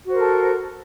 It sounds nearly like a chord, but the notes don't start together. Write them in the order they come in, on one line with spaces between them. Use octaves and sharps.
F#4 C5 A#4 A4